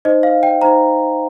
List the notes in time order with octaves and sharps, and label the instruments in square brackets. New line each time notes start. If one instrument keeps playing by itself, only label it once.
[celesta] D#4 C5 D#5
F5
G5
D#4 C5 A#5